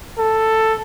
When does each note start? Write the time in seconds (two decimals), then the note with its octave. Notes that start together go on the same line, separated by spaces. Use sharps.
0.18 A4